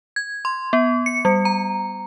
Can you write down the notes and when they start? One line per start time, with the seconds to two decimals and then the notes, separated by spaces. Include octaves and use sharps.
0.16 G#6
0.45 C6
0.73 B3
1.06 C#7
1.25 G3
1.45 A#5